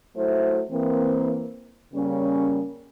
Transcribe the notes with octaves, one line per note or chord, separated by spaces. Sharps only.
F#3 A3 E4 C5
E3 A#3 C4
C#3 G3 A#3 C#4